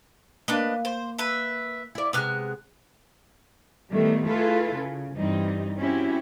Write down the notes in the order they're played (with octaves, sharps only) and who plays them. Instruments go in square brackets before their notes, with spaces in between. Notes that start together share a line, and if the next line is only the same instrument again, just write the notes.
[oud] A#3 [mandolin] D4 B4 D#5
[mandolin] C5
B4 E5
[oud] E4 D5
[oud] C3 G#3 [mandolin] B3 F6 F#6
[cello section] A2 D#3 G3 A3 B3
A3 E4 F4 G#4 A4 B4
C#3
G2 E3 G3 C4 D#4
C4 C#4 E4 F#4 G4